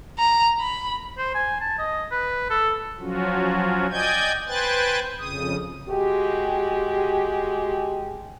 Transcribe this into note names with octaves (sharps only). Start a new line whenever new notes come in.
A#5
B5
C5
G#5
A5
D#5
B4
A4
F3 F#3 C#4 F4 F#4
D5 D#5 G5 G#5 G6 G#6
B4 C5 G5 G#5 F#6 A6
F2 C#3 D#6
G#3 F#4 G4